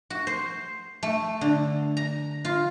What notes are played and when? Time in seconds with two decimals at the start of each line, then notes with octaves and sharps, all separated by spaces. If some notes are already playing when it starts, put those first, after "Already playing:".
0.10 F#4
0.27 C5
1.03 A3
1.41 D3
1.97 A#5
2.45 F4